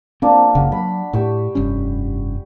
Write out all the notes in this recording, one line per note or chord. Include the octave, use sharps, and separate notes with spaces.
F3 A#3 C4 D4
F#1 C#2 C#3 F#4
F#3 B5
A2 G4 C#6 E6
F1 G2 C#4